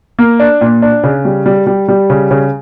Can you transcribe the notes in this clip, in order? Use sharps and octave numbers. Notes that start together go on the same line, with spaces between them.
A#3
D4
A#2
D4
C#3
G3
G3
G3
G3
C#3
C#3